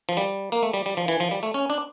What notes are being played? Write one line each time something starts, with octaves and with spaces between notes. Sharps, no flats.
F3
G3
A#3
A3
G3
G3
F3
E3
F3
G3
A3
C#4
D4